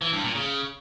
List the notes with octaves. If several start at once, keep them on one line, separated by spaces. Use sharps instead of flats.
E3
G2
A#2
C#3